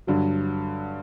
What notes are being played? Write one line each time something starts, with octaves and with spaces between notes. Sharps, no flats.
G2 D3 F#3